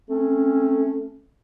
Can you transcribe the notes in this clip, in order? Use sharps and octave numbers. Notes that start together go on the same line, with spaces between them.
A3 C4 C#4